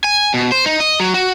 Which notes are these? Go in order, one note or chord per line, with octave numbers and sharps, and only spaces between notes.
G#5
B2
C5
D#4
D#5
F#3
F#4